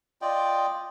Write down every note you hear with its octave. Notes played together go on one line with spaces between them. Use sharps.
F4 D5 D#5 G5